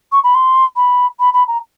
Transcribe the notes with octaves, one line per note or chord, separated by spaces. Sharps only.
C#6
B5
C6
B5
B5
B5
A#5